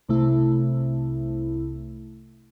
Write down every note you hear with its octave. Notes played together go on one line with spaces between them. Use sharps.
C2 C3 A3 E4